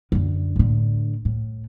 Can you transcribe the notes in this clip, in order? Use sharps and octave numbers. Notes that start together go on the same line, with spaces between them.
F#2 D3
A2 D3
A2